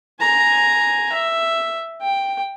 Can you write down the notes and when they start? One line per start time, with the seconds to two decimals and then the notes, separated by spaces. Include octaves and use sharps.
0.20 G#5 A#5
1.12 E5
2.02 G5